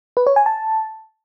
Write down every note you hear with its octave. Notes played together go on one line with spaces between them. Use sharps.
B4
C#5
G#5
A5